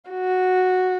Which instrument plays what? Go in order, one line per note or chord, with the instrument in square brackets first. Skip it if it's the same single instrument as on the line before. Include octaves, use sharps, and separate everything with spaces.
[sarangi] F#4